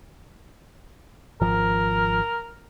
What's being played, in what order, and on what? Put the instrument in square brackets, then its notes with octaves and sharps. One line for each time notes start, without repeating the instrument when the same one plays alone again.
[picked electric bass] G#1 F3 [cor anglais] A#4